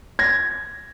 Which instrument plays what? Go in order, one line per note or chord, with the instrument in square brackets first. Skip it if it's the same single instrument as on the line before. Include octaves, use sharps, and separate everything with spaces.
[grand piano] G#6 A#6